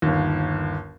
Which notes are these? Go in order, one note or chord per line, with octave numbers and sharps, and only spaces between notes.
G1 D#2